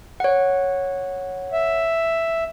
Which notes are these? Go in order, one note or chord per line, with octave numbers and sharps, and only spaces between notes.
C#5 F#5
E5